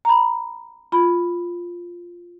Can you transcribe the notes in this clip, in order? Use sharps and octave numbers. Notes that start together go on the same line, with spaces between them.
A#5 B5
F4 B5